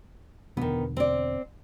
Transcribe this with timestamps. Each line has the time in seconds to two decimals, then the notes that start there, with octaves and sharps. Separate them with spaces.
0.57 E2 B2 D3 D#3 B3
0.97 C4 D5